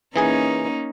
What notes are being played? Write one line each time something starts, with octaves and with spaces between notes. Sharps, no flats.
E3 A#3 C#4 D#4 G#4 G#5